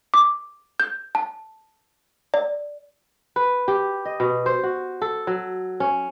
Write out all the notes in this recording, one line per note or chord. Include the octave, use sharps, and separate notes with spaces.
D6
G6
A5
D5
B4
G4
D#5
B2
C5
F#4
A4
F#3
C#4